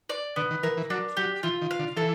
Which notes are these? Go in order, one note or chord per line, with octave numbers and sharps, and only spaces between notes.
D5
D3 B3
D#3
E3 A#4
E3
F#3 D4
F#3 G4
E3 F4
D#3
F5
D3
E3 A4